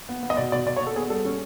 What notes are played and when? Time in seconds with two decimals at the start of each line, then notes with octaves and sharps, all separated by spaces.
0.09 B3
0.23 B3
0.30 D#5
0.37 B2 D5
0.52 B2 D5
0.66 B2 D5
0.77 C#5
0.81 B3
0.86 A4
0.96 B3 G#4
1.10 G3 A4
1.25 C#4